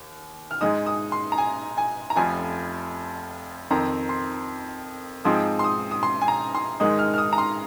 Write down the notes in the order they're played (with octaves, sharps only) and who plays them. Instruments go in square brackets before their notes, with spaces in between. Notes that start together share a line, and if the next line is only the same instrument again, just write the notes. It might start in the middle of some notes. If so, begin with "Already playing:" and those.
Already playing: [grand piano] D#2
[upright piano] F6
[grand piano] G#2 G#3 D#4 [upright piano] D#6
[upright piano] D#6
C6
A#5
G#5
G#5
A#5
[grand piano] F1 F2 F3 [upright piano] G#5
[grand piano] F2 D#3 C4 [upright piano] A#5
[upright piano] C6
[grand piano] G#2 F3 C4 D#4 [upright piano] D#6
[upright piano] C6
D#6
D#6
C6
G#5
A#5
C6
[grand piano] G#2 D#3 G#3 D#4 [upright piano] D#6
[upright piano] F6
F6
D#6
A#5
C6